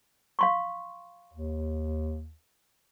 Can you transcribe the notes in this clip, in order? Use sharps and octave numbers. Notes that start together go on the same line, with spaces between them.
F5 C6 C#6
D#2